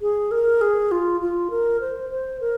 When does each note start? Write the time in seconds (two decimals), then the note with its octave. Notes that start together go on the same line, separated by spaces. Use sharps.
0.01 G#4
0.31 A#4
0.61 G#4
0.92 F4
1.21 F4
1.50 A#4
1.81 C5
2.10 C5
2.41 A#4